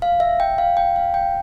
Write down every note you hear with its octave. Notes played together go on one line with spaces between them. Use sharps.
F5
E5
G5
F5
G5
F5
G5